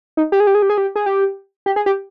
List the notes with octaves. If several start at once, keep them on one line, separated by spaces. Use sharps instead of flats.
D#4
G4
G#4
G4
G#4
G4
G#4
G4
G#4
G4
G4
G#4
G4